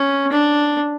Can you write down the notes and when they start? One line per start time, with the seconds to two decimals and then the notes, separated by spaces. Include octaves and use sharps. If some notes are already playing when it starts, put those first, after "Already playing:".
Already playing: C#4
0.32 D4